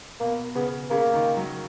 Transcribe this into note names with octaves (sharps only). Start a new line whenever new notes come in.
B2 A#3
C#3 B3
C#3 A#3
D#3
F#3